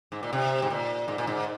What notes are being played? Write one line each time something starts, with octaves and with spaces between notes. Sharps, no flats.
G#2
A#2
C3
G#2
A#2
G#2
A#2
G#2